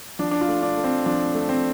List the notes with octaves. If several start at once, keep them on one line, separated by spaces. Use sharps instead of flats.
F3 D4
D4
F4
A3
D4
A3
C4
F3 D4
A3
C4